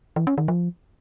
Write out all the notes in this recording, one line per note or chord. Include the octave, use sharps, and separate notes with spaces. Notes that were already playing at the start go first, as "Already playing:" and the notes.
E3
C#4
D#3
F3